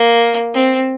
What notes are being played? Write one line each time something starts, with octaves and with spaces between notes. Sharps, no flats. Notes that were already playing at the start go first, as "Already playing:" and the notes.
Already playing: A#3
C4